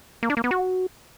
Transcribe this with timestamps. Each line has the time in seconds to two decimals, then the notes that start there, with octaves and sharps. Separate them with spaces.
0.23 A#3
0.30 D4
0.37 A#3
0.44 B3
0.51 F#4